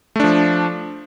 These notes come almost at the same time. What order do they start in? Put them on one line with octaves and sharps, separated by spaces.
A3 D4 F3